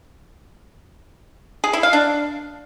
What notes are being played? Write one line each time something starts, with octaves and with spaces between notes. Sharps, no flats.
G#4
E4
F5
D4